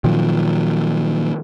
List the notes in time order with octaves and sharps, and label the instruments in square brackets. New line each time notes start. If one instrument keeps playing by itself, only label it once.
[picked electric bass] A#2 D#3 F3 F#3